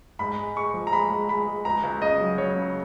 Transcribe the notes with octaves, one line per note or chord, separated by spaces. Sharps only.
G#2 B5
G#3
G#3 C#6
F3
A#5
G#3 B5
G#3
G#3 B5
G#3
C#2 A#5
C#2
C#3 D#5
F#3
F#3 C#5
C#3